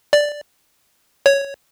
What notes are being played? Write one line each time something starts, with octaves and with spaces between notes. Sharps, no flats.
D5
C#5